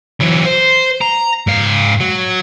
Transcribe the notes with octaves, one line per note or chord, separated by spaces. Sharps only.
E3 F#3
C5
A#5
G#2 F5
F#3